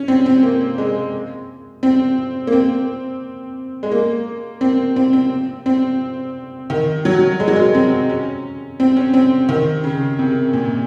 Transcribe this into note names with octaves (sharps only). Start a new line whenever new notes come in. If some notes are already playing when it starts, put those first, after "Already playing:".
Already playing: C#4
C4
C4
A#3
G#3
C4
A#3
C4
G#3
A#3
C4
C4
C4
C4
D#3
F#3
G#3
F#3
G#3
C4
C#4
C4
C#4
C4
D#3
C#3
C3
A#2